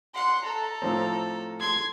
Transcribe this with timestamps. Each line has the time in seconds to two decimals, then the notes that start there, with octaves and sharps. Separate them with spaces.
0.14 F#5 C6
0.45 A4 A#5
0.82 A2 F3 C4
1.60 C6 G#6